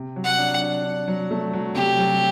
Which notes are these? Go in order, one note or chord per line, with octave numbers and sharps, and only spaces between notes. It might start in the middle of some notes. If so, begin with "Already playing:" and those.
Already playing: C3
F#3
F#5
D4
D4
D4
F#3
A3
F#3
C3 G4
F#3